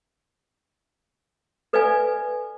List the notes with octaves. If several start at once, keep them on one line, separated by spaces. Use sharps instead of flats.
A4 B4 D5 E5 F5 G#5